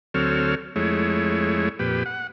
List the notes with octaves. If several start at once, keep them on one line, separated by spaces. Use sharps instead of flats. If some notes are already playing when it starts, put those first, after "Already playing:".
D2 F#3 C4 A4 C#5 F6
F2 G#3 A3 E4 C#5
F2 A#2 G4 B4
F#5